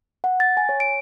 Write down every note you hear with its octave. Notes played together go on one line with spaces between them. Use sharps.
F#5
A6
G#5
C#5
D7